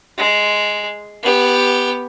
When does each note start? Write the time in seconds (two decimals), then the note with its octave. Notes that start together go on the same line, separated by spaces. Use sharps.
0.18 G#3
1.23 B3 G4